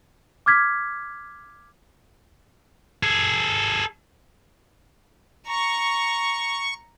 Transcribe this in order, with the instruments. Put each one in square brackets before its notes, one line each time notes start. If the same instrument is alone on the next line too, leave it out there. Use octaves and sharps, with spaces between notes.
[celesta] D6 F6 G#6 B6
[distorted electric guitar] G#4 A4
[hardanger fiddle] A#5 [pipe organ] C#6